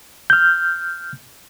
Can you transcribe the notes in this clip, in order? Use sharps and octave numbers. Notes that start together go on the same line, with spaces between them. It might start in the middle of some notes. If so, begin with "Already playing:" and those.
F6 G6